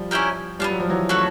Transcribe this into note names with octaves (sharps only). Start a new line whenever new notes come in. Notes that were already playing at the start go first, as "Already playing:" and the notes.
Already playing: F3 G3
C#4 E4 G4 A#4
G3 B3 D4 F4
F#3
F3
E3 F#3
A3 C#4 F#4 A4